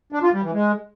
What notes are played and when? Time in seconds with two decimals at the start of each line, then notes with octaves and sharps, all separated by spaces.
0.12 D4
0.23 F4
0.33 G3
0.43 E3
0.53 G#3